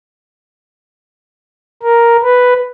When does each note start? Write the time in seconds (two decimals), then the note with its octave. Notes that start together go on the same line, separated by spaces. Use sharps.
1.83 A#4
2.23 B4